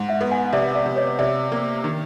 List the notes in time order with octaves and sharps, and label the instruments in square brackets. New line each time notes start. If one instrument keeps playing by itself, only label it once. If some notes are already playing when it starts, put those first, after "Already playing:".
Already playing: [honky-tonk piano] G#2
[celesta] E5 F#5
[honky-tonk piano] B3
[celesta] F#5 G#5
[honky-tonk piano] C3 [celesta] D5 E5
[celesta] D5 E5
[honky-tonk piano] C3
[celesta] C#5 D#5
[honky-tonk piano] C3 [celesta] D5 E5
[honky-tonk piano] A#3
D#3